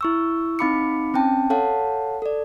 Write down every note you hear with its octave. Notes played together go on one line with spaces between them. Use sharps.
E4 C#6 E6
C4 D#4 F5 B5 D6 C#7
C4 C#4 G5 A5
A4 C#5 F5 F#5 A5
A4 D5